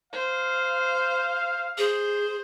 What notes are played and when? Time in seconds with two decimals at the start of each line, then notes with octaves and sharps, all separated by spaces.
0.13 C5 F5
1.78 G#4 C5